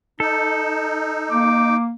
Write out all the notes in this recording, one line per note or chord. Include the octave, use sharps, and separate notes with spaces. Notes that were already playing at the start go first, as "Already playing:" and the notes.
D#4 A4
A#3 D6